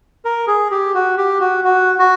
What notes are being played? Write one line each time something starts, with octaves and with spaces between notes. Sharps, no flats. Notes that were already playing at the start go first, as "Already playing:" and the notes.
A#4
G#4
G4
F#4
G4
F#4
F#4
F#4